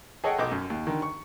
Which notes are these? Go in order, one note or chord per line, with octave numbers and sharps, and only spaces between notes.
G#4 A4 C#5 D#5 F#5 G5
B1 D#5 D6
F#2
D#2
D3 D#3
C#6